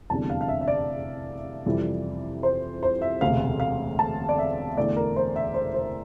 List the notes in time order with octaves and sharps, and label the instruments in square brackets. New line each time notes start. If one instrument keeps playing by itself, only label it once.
[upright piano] F1 E2 D3 G3 D4 A5
F5
F5
E5
E5
D5
F2 C3 E3 G3
C5
C5
E5
E1 D2 C3 F5
F5
A5
D5
E5
E2 D3 A3 D5
A#4
C5
E5
C5
C5